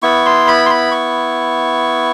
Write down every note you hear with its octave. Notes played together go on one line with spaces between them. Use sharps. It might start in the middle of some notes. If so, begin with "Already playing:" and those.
B3 E4 C#6
C6
B5
C6
B5
C#6